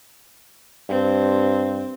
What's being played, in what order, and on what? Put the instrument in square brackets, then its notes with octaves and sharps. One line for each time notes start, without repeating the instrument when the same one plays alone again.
[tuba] G2 [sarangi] C4